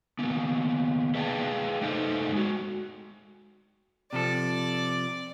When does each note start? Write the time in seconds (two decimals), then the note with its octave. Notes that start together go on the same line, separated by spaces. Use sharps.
0.19 D#3 A#3 B3
1.15 G#4 B4 D5 F5 G5 A5
1.81 A3 A#3 D#4 A4 C5 D#5
2.33 G#3 F#4
4.13 C3 F3 A4 D5